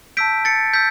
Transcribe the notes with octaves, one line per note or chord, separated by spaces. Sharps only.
A5 E6 G6 B6 D7
A6 C#7
E6 G6 B6